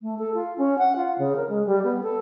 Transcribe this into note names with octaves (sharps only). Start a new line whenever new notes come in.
A3
A4
F4
C#4
F#5
F4
C#3
A#4
G#3
G3
B3
A4